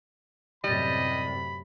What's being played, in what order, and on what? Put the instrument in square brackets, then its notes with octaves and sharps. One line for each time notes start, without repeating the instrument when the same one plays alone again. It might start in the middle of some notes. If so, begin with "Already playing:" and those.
[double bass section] F#2 A2 C3 [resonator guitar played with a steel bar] G3 [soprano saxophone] D#5 [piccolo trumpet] B5